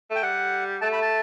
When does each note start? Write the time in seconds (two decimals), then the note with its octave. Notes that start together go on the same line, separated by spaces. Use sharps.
0.11 A3 G5
0.23 G3 F#5
0.81 A3 A5
0.92 B5
1.02 A5